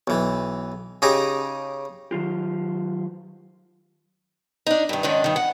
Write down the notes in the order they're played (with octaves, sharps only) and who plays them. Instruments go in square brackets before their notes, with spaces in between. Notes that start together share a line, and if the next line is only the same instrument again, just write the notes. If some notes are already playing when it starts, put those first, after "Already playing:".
[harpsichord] B1 E3
C#3 D#4 G4 G#5 A#5
[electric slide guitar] D#3 F#3 F4 G4
[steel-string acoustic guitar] D4 D#4
G2 D#3
G#2 D#3 C#4 D4
G2 D#3
F#5